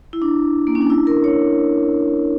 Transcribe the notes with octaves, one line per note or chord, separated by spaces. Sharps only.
E4
D4
A#3
C#4
D4
E4
A#4
C#5